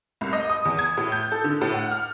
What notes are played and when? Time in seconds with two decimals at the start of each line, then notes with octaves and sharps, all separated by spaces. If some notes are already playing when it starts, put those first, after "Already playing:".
0.21 C2
0.33 D#5
0.50 D#6
0.65 E2
0.79 G#6
0.97 A2
1.12 G6
1.32 A4
1.44 D3
1.61 A2
1.74 F#5
1.91 F6